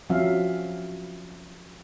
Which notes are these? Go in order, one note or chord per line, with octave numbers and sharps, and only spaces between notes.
F3 F#3 C4 C#4 E5 F5